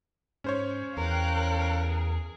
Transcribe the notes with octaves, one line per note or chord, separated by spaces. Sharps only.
G#2 C#4 C5 C#5
E2 A#4 F5 G5 F#6
G#4